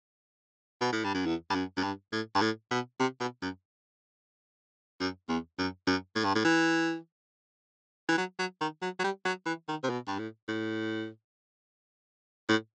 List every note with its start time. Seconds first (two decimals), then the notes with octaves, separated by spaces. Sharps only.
0.81 B2
0.92 A2
1.04 G2
1.14 F#2
1.26 E2
1.50 G2
1.55 F#2
1.77 F#2
1.83 G2
2.12 A2
2.35 G2
2.41 A2
2.71 B2
2.99 C3
3.20 B2
3.42 F#2
5.00 F#2
5.29 E2
5.59 F#2
5.87 F#2
6.15 A2
6.24 G2
6.35 A2
6.45 E3
8.09 E3
8.18 F#3
8.39 F#3
8.61 D#3
8.82 F#3
8.99 F#3
9.04 G3
9.25 F#3
9.46 E3
9.69 D#3
9.83 C3
9.89 B2
10.08 G2
10.19 A2
10.48 A2
12.49 A2